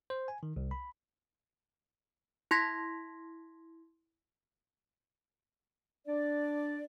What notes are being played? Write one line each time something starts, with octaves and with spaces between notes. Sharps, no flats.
C5
G#5
D#3
C2
B5
E4 C6 G#6 A#6 B6
D4 D5